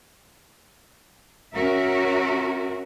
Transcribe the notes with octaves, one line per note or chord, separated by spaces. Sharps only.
C#4 F#4 A#4 E5